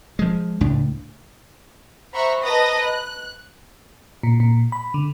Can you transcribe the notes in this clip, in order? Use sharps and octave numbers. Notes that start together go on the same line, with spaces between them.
F3 G#3
C#2 A2 D4
C5 E5 F#5 A#5 B5 C#6
B4 D#5 A5 A#5 D#6 A#6
F#6
A#2
A#2
B5
D3